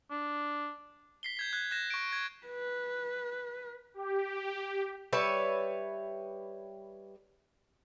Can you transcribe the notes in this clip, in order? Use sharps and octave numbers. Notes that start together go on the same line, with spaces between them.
D4
B6 C7 G7
G6 G#6 B6
F#6 G#6
F#6 G6 A#6 E7
C#6 D7
G#6
B4
G4
G3 B4 C#5 E5